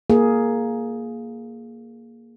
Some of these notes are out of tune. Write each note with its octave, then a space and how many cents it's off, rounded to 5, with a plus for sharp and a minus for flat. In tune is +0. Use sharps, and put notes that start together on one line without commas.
A#3 +0 G#4 +10